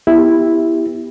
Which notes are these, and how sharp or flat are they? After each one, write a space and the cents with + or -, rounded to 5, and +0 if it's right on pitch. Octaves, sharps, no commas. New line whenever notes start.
B3 +0 E4 +0 G4 +15